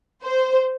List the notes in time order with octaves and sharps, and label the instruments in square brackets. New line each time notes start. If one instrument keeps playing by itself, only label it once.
[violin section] C5